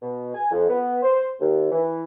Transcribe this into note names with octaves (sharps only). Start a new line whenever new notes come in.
B2
G#5
F2
B3
C5
D#2
E3